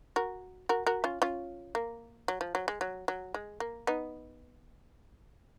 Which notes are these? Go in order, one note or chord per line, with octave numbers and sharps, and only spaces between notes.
F#4 A#4
F#4 A#4
F#4 A#4
C#4 F4
C#4 F4
A#3
F#3
F3
F#3
G#3
F#3
F#3
G#3
A#3
B3 D#4